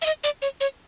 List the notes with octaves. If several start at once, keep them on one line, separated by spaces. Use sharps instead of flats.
E5
D#5
D5
C#5
C#5